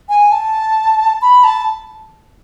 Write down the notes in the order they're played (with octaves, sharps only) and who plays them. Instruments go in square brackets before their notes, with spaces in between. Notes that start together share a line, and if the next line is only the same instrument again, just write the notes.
[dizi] G#5
A5
B5
A5